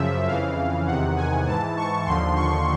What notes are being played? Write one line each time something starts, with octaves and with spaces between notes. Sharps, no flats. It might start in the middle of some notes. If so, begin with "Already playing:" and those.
Already playing: F#2 C#3 F3 E5
F2 C#3 E3 F5
E2 C3 D#3 F#5
G#5
G#2 E3 A5
C#6
D#2 D3 F3 C6
C#6